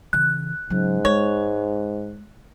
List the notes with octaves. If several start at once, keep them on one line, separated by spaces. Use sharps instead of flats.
C#3 E3 F#6
G#2 C#3 F#3
G#3 C#5